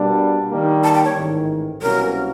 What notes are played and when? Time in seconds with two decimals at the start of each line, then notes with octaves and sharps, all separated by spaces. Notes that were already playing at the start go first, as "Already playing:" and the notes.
Already playing: B2 G3 A#3 D4
0.50 D#3 G3 A#3
0.84 A5
0.94 G5
1.05 C#5
1.15 A1 G#2 D#3
1.82 C2 B2 F#3 A#3 C#4 A#4